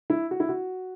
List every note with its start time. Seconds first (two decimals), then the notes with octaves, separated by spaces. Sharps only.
0.10 E4
0.31 F#4
0.40 E4
0.49 F#4